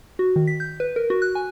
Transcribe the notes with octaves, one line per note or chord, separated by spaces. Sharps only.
F#4
D#3
B6
G6
B4
A#4
F#4
F#6
G#5